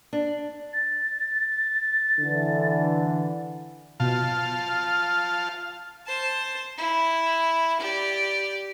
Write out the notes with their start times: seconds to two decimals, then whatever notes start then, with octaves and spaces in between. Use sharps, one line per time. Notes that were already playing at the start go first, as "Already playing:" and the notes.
0.13 D4
0.72 A6
2.18 D3 E3
4.00 B2 F4 F5 A5
4.24 F6
6.06 C5 A5
6.78 E4
7.80 G4 D5